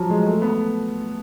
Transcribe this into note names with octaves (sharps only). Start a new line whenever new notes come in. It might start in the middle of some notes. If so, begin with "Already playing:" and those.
Already playing: F3 F#3
G#3
A3
B3